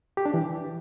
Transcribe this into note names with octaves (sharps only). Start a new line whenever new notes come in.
G4
D4
E3